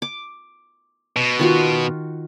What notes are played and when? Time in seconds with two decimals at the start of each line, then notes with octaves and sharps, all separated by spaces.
0.02 D6
1.16 B2
1.39 D#3 F4 F#4